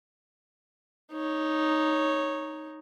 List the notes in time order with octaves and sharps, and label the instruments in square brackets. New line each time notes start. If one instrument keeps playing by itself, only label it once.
[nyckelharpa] D#4 C#5